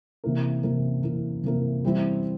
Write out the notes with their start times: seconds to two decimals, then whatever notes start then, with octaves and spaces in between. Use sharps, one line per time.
0.24 C3 E3 A#3 E4 A#4
0.63 C3 E3 A#3 E4 A#4
1.03 C3 E3 A#3 E4 A#4
1.43 C3 E3 A#3 E4 A#4
1.83 E3 G3 C4 E4